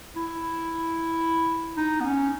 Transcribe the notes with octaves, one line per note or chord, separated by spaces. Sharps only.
E4
D#4
B3
C#4